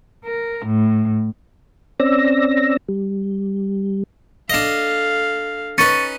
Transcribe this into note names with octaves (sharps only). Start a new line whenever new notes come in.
A#4
A2
C4 C#4 D5 E6 A#6
G3
D4 A4 D#5 F5
C#4 D#4 B4 C#6 A6 C#7